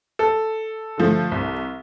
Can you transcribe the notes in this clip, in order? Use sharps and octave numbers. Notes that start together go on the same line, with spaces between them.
A4
D3 F3 A3
C2